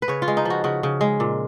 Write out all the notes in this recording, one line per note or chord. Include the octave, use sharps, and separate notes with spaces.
B4
C#3 C#5
F4
G#3
D#4
F3 F#4
C#3 F#4
C#3
G#3
A#2